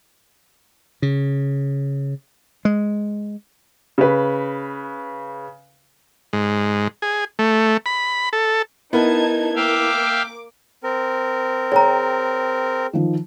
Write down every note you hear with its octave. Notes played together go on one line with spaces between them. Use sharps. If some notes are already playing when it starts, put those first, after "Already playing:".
C#3
G#3
C#3 B4
G#2
G#4
A3
B5
A4
B3 D#4 E4 A#4 A5 G#6
A#3 E5 F5 G5 D6
C4 A#4
G#4 C#5 G5 A#5
D#3 F3